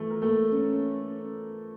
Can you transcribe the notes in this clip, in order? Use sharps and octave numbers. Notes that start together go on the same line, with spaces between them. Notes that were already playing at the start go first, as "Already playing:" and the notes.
Already playing: E3 F3 A3 E4 A4
A#4
A3 A#3 A4
C#4